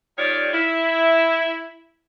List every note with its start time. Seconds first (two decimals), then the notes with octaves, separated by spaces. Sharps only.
0.17 D#3 F3 G3 C#5 D5 F5
0.53 E4